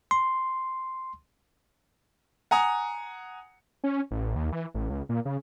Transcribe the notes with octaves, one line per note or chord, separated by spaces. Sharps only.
C6
F#5 G#5 A#5 D#6
C#4
A1
D#2
E3
A1
C#2
A#2
C#3